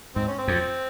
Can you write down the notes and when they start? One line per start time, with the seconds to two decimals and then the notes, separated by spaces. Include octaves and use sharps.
0.16 G#2 C4
0.28 C#4
0.38 C4
0.48 F2